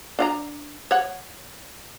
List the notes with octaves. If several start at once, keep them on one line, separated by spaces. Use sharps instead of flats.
D4 F5 A#5
C#5 F#5